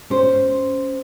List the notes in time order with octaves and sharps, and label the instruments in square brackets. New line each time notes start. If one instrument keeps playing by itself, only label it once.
[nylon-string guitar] C#4 C5